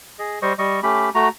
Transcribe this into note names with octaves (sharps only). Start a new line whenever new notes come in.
G#4 D#5
G3 C5 D#5 C#6
G3 D#5 C#6
A3 C#4 G4 B5
A3 F#4 A#5